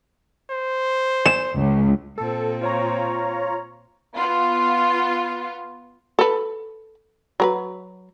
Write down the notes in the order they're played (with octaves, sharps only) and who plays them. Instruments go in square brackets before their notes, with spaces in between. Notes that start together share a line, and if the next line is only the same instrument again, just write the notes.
[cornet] C5
[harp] E7
[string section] C#2
[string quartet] A#2 C4 [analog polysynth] A4
[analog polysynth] F4 C#5 A#5
[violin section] B3 F4
[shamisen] A4 B4
F#3 A#4 B4